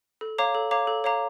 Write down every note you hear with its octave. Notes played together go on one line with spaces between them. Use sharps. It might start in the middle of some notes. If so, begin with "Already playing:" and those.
A4
C#5 F5 A#5 D6
A4
C#5 F5 A#5 D6
A4
C#5 F5 A#5 D6